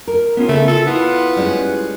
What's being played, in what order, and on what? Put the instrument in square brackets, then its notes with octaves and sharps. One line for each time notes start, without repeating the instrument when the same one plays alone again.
[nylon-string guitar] A#4
[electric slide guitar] B3 C#4 F4
[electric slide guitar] C#3 [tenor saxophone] A3
[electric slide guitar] F4 [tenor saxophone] A4
[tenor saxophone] B3 [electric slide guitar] E4 F4
[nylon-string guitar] G3 G#3 C#4